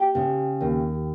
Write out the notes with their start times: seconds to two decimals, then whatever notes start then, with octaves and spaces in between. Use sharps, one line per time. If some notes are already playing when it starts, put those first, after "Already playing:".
Already playing: G4
0.15 C#3
0.61 D#2